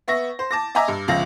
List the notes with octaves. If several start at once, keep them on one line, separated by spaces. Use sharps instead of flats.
B3 E5 C#6 A#6
C5
A5 D6 A#6
D#5 E5 G#5 A#5 D6 E6
G2
G1 C#2 F3 F5 A#6